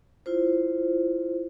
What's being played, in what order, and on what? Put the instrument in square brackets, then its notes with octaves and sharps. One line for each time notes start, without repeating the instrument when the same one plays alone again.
[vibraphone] E4 F4 C5